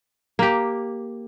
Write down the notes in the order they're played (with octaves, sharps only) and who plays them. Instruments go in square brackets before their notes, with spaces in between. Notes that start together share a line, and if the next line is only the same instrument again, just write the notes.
[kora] A#3 G4